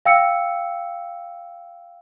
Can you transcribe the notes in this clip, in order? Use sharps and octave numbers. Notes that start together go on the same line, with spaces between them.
F5 G5 E6 C#7